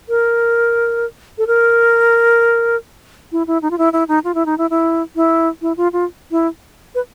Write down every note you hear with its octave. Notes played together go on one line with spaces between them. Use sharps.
A#4
A4
A#4
E4
E4
D#4
F4
E4
E4
D#4
F4
E4
D#4
E4
E4
E4
E4
F4
F4
E4
B4